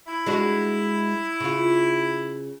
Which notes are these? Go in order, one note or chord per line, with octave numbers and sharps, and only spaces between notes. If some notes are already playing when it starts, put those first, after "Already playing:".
E4
G#3 D4 F#4
C#3 F4